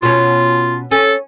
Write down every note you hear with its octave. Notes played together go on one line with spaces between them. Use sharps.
B2 C#4 F4
C#4 A4